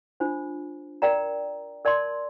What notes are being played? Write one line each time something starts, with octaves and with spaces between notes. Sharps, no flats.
D4 F4 C5
A#4 D5 G5 A#5
A#4 D5 A5 C6